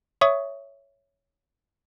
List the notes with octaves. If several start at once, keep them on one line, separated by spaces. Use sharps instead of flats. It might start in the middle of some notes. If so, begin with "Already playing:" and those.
C#5 E5 C#6 D#6